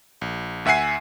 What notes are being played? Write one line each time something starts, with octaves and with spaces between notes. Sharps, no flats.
A#1
D2 E5 F#5 G#5 C7